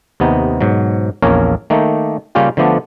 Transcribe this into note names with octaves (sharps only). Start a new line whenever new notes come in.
D#2 C3 B3 D#4
G#2 B2 F#3
A#1 E2 A#3 C#4 A#4 C#5
D#3 A3 A#3 D#4
C#3 G3 A#3 C#4 F4 G4
D3 F3 A3 B3 D4